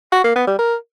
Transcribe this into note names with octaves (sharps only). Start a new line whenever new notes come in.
F#4
A#3
B3
G3
A#4